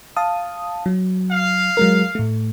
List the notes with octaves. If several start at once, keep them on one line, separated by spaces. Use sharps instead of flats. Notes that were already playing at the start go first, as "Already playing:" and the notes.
F5 A5 D#6
F#3
F5
F#3 G#3 A#4
A2 A3